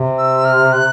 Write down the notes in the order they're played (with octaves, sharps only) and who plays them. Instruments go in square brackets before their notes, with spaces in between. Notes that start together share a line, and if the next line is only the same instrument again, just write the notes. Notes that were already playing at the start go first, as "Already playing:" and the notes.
Already playing: [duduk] C3
[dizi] E6
F6
F#6